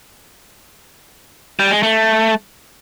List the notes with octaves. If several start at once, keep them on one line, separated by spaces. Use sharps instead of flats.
G3
G#3
A3